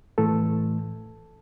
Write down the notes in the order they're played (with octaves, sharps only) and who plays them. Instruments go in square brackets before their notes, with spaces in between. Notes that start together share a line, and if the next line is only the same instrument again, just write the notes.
[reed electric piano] A2 E3 A3 A4